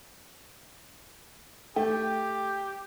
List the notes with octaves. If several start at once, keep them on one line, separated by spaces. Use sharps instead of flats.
A3 G4 G5